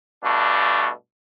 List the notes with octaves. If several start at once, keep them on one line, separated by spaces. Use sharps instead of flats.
G2 B2 A3 D4